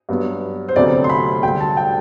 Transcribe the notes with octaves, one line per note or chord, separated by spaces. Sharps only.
G2 F#3 B3
C5
D2 C3 F#3 B3 D5
C6
B5
D2 D3 G3 G5
A5
G5